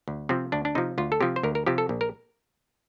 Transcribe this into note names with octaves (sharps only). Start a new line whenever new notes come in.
D2
C3 F3 C4
D2 D4
D4
C3 F3 D#4
D2 F4
A4
C3 F3 G4
C5
D2 A#4
A#4
C3 F3 G4
A4
A#1
A#4